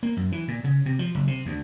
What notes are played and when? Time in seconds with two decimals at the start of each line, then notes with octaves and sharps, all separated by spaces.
0.03 A#3
0.17 F#2
0.32 E3
0.48 A#2
0.64 C#3
0.86 C3
0.99 F3
1.15 F#1
1.27 C3
1.45 D2